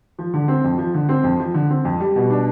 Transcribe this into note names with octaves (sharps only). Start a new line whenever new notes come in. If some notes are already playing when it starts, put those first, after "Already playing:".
F3
D3
C4
F2
F3
D3
C4
F2
F3
D3
C4
F2
G3
B2
D4